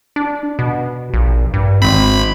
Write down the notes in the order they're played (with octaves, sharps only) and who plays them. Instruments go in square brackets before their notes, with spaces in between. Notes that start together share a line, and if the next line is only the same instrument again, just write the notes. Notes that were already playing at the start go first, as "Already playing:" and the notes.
[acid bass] D4
B2
A#1
G2
[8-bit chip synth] G#1 B5 [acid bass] C4